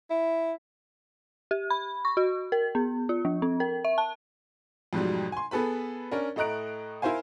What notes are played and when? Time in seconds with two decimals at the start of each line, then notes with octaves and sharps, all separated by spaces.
0.10 E4
1.51 G4
1.70 B5
2.05 C#6
2.17 F#4
2.52 A#4
2.75 B3
3.09 F4
3.25 F3
3.42 C4
3.60 A#4
3.85 E5
3.98 A5
4.93 F2 G#2 B2 F#3 G3
5.32 G#5 C6
5.51 B3 G#4 A4 B4 B5
6.11 C#4 D4 A#4
6.36 A2 A3 D#5 A#5 F#6 D7
7.02 E4 A#4 C5 F5 G#5